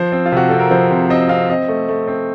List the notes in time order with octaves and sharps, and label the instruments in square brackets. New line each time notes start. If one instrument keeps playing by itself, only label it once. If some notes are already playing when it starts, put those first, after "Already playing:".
Already playing: [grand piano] F3 C5
C4
F4
C3 F#4
C4 A4
A#4
F3 C5
C3
C4 D#5
C4 F5
C4 D#5
A3
A3
C4